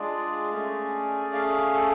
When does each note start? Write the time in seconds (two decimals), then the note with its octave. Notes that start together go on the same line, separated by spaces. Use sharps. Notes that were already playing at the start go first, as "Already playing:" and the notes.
Already playing: G#3 D4 F4 G#4 D5
0.51 A3 C#4 G#4
1.34 F5
1.75 A4